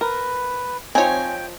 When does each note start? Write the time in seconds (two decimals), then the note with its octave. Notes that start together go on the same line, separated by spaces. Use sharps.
0.01 A#4 B4
0.95 F3 C4 D#4 C#5 G5 G#5